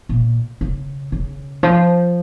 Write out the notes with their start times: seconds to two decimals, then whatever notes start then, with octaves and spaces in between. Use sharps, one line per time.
0.09 A#2
0.61 C#3
1.12 C#3
1.63 F3